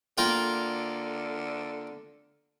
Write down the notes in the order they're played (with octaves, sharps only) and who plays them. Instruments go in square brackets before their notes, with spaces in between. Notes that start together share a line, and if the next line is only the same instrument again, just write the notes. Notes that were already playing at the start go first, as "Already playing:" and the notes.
[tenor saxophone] D3 [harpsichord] A#3 F4 G5